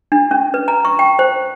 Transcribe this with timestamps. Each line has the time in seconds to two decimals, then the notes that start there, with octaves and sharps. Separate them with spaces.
0.12 D4
0.31 C#4
0.54 B4
0.68 A#5
0.85 C#6
0.99 G5
1.19 C5